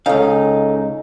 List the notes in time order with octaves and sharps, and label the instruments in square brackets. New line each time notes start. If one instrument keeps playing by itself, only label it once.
[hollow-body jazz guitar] C#2 F5 [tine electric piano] C#4 D#4 A4